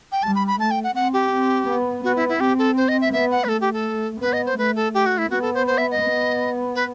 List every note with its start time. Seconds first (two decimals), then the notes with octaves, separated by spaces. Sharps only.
0.12 G5
0.23 G3 A5
0.35 B5
0.47 B5
0.60 A3 A5
0.71 G5
0.84 F#5
0.95 C4 F#5
1.13 G4
1.31 C4
1.68 B3
2.04 B3 F#4
2.16 E4
2.29 E4
2.40 C4 G4
2.58 A4
2.77 C5
2.88 D#5
3.01 E5
3.13 B3 E5
3.31 F#5
3.44 B4
3.49 A3 A4
3.61 G4
3.73 A4
4.21 B3 B4
4.33 D#5
4.46 C5
4.58 A3 B4
4.76 A4
4.94 G4
5.06 F#4
5.18 E4
5.30 B3 F#4
5.42 A4
5.54 C5
5.67 C5
5.78 E5
5.91 D#5
6.03 B3
6.75 B4